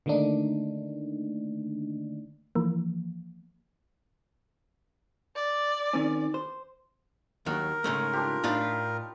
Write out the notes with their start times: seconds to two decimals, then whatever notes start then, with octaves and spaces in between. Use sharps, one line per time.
0.06 D3 D#3 A3 A#3 D4 D#4
2.55 E3 F3 A#3
5.36 D5
5.93 D#3 C4 C#4
6.34 C5
7.46 D#2 F#3 A#4 F#5
7.84 G#2 C#3 A3
8.13 D4 F4 G4
8.44 A2 D4 D#4 F4 B5